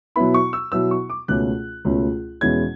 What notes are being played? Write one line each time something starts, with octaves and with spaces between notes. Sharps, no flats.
B2 F#3 B3 E4 B5
C#6
E6
B2 F#3 B3 E4 E6
C#6
D6
C#2 B2 A3 C#4 F#6
C#2 B2 A3 C#4
E2 B2 G#3 C#4 E4 G#6